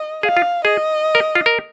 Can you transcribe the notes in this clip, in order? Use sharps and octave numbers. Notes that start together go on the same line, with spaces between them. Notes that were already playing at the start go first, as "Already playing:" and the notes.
Already playing: D#5
G#4 F5
F4
G#4 D#5
A#4
F4
A#4